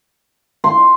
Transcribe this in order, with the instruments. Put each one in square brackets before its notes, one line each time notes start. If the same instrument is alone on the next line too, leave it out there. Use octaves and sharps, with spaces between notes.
[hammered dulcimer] C6